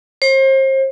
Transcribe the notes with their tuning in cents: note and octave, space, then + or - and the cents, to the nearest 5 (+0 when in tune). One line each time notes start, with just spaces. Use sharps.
C5 +35